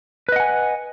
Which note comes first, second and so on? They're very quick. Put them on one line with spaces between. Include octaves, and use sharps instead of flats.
B4 D#5 F#5 G#5